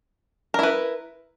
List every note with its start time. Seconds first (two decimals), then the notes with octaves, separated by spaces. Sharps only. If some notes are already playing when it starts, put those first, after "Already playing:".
0.54 A#4
0.59 E4
0.63 B4